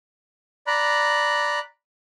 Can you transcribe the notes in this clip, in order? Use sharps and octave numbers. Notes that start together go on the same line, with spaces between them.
D5 A#5 B5 F#6